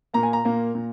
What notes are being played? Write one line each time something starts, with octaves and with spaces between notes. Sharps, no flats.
A#2 A#3 A#5
G#5
A#5
A#2 A#3
A#2